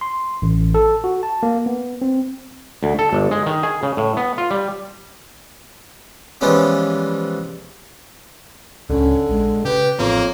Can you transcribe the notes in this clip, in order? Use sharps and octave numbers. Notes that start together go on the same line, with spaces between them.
C6
A1
A4
F#4
A5
A#3
B3
C4
D2
A4
G1
G#3
D#3
G#4
C#3
A2
B3
F4
G3
E3 F3 G3 G#3 B3 C#4
D1 G1 C#2 D3 C#4
A#1 G#3
C#3 G4 B4
A1 F2 A#3 B3 C#5